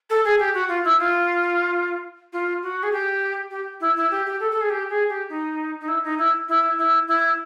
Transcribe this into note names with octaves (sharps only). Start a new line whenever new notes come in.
A4
G#4
G4
F#4
F4
E4
F4
F4
F#4
G#4
G4
G4
E4
E4
G4
G4
A4
A4
G#4
G4
G#4
G4
D#4
D#4
E4
D#4
E4
E4
E4
E4